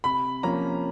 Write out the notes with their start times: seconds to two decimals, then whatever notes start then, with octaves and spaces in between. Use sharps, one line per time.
0.04 C3 B5
0.43 F3 A#3 C#4 A#5